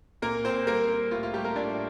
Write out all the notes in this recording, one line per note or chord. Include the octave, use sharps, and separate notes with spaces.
A#2 A#3 A#4
A#2 C4 C5
G3 A#3 A#4
A#3
A2 F4
F4
G3 A3 G4
A#3 A#4
A2 D4 D5